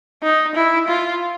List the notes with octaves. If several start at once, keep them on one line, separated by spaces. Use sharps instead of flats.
D#4
E4
F4